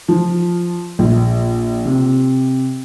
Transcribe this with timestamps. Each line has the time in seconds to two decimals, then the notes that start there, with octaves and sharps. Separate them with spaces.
0.08 F3
0.99 A#1
1.85 C3